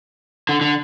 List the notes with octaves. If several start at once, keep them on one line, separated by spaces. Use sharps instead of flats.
D3
D3